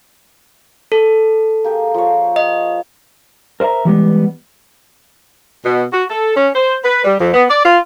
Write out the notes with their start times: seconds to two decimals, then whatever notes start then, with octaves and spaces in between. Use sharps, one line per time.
0.92 A4
1.64 A#3 G4 G#4
1.94 F3 C#5
2.36 D#5
3.60 A#4 C5 D5 E5 A#5
3.85 E3 G3 G#3 B3
5.64 B2
5.92 F#4
6.10 A4
6.36 C#4
6.55 C5
6.83 B4
7.04 G3
7.19 F2
7.34 B3
7.50 D5
7.64 F4